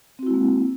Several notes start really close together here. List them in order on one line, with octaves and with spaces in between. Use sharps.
C4 F#4 E4 G#3 A#3